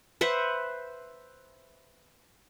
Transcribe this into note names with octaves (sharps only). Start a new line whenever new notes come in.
B4 C5 E5 F#5